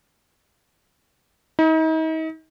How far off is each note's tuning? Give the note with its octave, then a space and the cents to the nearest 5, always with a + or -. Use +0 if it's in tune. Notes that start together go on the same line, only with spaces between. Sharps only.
D#4 +40